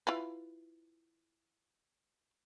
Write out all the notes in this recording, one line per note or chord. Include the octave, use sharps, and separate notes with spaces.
E4 F4 B4